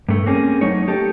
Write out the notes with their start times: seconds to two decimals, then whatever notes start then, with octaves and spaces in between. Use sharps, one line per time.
0.09 G2 A3
0.26 A#3 C4 C#4 G#4
0.61 F#3 A3 D#4 C#5
0.87 D#4 G4 A4